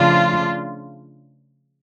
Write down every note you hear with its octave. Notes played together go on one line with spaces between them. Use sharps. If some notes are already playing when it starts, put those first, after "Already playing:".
Already playing: C#3 F3 A3 D4 F4